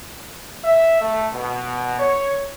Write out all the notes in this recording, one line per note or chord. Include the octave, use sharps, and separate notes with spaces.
E5
A3
B2
C#5